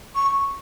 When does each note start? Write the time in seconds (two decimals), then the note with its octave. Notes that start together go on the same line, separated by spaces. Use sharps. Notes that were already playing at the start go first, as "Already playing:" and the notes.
0.15 C#6